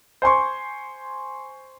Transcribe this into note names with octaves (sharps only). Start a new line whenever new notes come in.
C5 G#5 C6 C#6